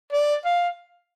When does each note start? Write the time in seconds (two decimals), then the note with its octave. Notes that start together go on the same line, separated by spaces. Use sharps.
0.12 D5
0.45 F5